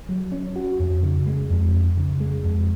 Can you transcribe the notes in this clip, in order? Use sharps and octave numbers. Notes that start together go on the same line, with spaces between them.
F#3
C#4
F#4
F2
C#3
G#3
F2
F2
C#3
G#3
F2